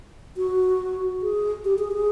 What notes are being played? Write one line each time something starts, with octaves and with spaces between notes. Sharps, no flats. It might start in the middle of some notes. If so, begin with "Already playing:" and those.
F#4
G#4
G4
G#4
G#4